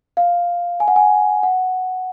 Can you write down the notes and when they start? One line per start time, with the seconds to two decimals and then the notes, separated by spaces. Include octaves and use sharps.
0.17 F5
0.80 G#5
0.88 F#5
0.96 G#5
1.43 F#5